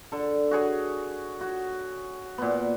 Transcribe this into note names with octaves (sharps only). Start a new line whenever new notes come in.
D3 A4
F#4 G#4 C#5
F#4
A#2 B3